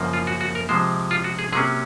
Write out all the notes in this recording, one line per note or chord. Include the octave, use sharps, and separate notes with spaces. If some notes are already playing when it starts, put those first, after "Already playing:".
Already playing: F#2 C#3 F3 A#3
F4
F#4
F#4
A#4
C3 F3 G#3 C5
F4
F#4
G#4
C3 F#3 A#3 C#4 G#4